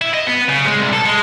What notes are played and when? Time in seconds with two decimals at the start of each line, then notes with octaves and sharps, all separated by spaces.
0.01 E4
0.14 D#5
0.26 B3
0.48 C#3
0.66 G#3
0.79 C2
0.93 A4
1.05 G#3